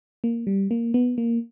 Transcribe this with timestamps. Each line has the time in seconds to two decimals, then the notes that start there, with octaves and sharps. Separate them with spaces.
0.24 A#3
0.47 G3
0.71 A#3
0.94 B3
1.18 A#3